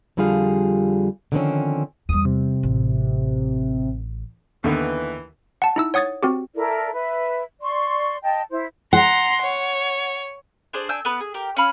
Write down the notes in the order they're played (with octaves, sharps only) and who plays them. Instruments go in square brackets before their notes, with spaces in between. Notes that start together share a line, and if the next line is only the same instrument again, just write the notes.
[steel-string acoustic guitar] F2 D3 G3 F4 G#4 F5
D3 D#3 F3 G3 C4 C#4
[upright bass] E2 G3 [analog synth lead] D#6
[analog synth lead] C3
[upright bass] A1
[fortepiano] D#2 D3 B3 [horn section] E3
[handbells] F#5 A5
D#4 E4 E6
C#5 F#5 D#6 G#6 A6
C4 F#4 G4
[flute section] E4 A4 A#4 D5
B4 E5
D5 C6 C#6
D#5 G5 A5
E4 C5
[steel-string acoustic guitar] F#5 [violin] A#5 C6
[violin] C#5
[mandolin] D4 G#4 C5 D5
D4 G#5 E6 G6
B3 B4
G#4
G4 A#4
C#4 F5 B5 F6